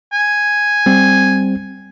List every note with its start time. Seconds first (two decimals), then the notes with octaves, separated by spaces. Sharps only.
0.12 G#5
0.86 G3 C4